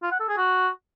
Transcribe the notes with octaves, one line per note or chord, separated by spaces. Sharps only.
F4
F#5
A4
G#4
F#4